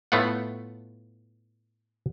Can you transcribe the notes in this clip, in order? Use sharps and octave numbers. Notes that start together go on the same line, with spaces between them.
A2 A3 B3 F4 F#5